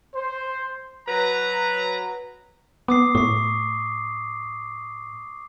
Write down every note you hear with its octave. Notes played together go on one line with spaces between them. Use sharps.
C5
F#3 B4 A#5
B3 D6 D#6 C7
A2 C#6 C7